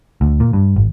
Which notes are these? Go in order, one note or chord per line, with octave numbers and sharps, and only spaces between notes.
D2
A#2
G2
G#1